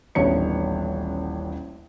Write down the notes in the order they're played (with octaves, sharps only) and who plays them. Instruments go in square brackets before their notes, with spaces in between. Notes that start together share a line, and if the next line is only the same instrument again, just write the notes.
[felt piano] D#1 A1 B3 D4 C#5 C#7